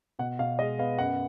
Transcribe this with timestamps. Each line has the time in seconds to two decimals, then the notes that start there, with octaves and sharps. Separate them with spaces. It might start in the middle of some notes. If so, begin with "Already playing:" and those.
0.19 B2 F#5
0.39 B2 F5
0.59 G#3 D#5
0.79 B3 F5
0.99 F#2 F#5